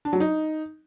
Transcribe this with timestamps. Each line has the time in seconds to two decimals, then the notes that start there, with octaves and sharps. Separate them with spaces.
0.05 D4
0.13 F#3
0.20 D#4